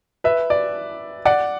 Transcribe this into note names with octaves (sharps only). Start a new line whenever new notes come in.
B4 E5
D5
D5 F#5